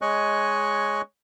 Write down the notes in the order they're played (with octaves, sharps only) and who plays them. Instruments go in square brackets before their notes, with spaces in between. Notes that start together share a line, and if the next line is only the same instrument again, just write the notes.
[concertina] G#3 C#5 D#5 G#5 C#6 F#6